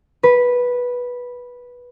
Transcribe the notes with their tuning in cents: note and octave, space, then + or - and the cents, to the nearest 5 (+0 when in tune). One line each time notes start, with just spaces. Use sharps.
B4 -10